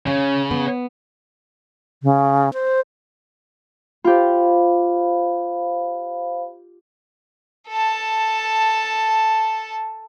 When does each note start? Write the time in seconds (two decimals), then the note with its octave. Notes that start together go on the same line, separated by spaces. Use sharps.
0.07 C#3 C#4
0.51 B3
2.03 C#3
2.53 C5
4.04 F4 G4 C5 F5 B5
7.68 A4 A5